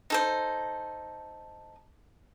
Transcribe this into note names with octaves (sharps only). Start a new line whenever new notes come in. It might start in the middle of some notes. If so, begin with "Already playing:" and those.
D#4 A4 C5